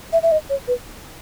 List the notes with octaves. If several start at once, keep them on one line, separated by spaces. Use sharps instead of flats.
E5
E5
D#5
C#5
B4